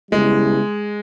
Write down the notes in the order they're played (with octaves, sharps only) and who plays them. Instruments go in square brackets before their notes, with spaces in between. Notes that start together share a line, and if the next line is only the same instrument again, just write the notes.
[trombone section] C#3 G3 B3 E4 [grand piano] G#3